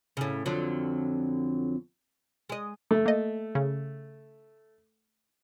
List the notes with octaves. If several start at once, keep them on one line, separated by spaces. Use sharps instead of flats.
A2 C#3
F2 D3 F#3
G#3 D#5
A3
A#3 D#5
C#3